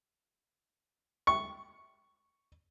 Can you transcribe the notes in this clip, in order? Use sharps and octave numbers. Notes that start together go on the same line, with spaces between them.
C#6